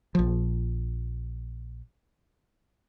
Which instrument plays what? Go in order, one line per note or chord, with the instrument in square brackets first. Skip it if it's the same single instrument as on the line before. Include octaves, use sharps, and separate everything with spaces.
[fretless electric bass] A#1 F3